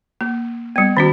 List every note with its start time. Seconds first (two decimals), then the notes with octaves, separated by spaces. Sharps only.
0.21 A#3
0.76 G3 B3
0.97 D#3 C#4 F#4